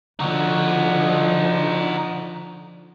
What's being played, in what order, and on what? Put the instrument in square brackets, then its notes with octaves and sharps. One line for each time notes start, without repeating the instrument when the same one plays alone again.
[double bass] D3 F3 [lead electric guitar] D#4 F#4